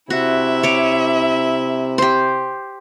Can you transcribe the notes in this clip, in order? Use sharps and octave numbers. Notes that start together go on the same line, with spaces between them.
C3 E4 F#4 E5
C#5 D6
G4 C5